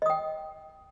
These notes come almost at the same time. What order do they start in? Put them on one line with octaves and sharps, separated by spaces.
D#5 D#6 G5